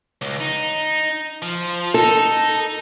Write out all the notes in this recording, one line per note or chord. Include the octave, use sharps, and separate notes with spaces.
C#2
D#4
F3
D#4 A4